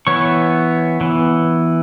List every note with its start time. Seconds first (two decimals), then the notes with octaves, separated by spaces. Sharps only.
0.07 E3 B3 C#5 C#6
1.01 E3 B3